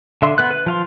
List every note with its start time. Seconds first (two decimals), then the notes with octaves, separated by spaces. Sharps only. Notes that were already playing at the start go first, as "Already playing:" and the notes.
0.22 D3 E5 C6
0.38 B3 B4 F#6
0.51 B4
0.66 F3 F5 C6